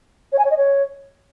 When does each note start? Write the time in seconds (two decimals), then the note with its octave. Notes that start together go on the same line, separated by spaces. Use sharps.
0.32 C#5
0.38 G#5
0.44 C#5
0.51 D#5
0.57 C#5